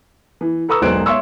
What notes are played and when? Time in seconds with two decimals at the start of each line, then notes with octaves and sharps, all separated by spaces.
0.41 E3
0.69 A4 B4 A#5 C#6 D#6 E6
0.82 E1 B1 F#3 C5 F#6 D7
1.06 C#5 E5 C6 C#6 E6